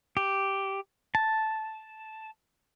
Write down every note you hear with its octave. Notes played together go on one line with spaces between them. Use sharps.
G4
A5